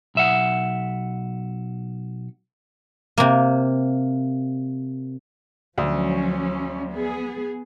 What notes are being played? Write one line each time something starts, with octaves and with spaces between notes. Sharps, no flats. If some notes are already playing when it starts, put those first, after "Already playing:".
B1 E5 F#5
C3 A#3
D2 F3 F#3 C#4
B3 G#4